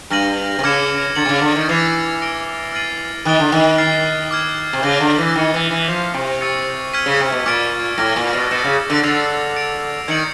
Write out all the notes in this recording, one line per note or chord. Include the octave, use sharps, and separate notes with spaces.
G2 F6 A#6 D#7 F#7
C3
C#3 D6 F6 G#6 C#7 E7
D3 A6 C#7 F#7
C3
C#3
D3
D#3
E3 A6 C7 F7
F6 A#6 D7 G7
F6 A6 C7 D#7 F#7
D#3 D#6 F#6 A6 D7 G7
D3
D#3
F6 A6 C7
D6 F6 G#6
C3
C#3 G6 A#6 D#7 G7
D3
E3
D#3 F6 A6 C#7
E3
E3
F3 D6 G6 C7 F7
C3
C#6 E6 A6 C#7
F6 G#6 B6 D#7
C#3
C3
B2
A#2 D6 F6 A6 D7
A2 D6 F6 A#6
A#2
B2
B2 E6 G6 A#6 C#7 E7
C#3
D3
D3 E6 A6 C7 F7
A6 D7 F7
D#3 G#6 C#7 F#7